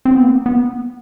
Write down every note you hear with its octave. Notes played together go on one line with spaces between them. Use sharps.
C4
B3
A#3
B3